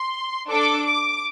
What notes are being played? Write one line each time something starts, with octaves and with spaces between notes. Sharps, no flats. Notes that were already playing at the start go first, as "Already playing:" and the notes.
Already playing: C6
D4 A4 D6
D6